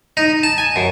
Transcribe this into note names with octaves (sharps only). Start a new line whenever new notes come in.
D#4
A5
G#5
F#2